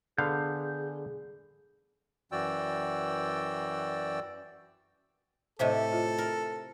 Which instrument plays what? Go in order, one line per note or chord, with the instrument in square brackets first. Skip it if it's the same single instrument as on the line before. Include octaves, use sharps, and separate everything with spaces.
[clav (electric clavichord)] D3 B3 F5 [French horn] G#4 [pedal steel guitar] G6
[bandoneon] F#2 E3 F#4 D5 G5 E6
[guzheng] A2 C3 G4 [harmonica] A4 [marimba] C5 D#5
[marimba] F4
[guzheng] A#4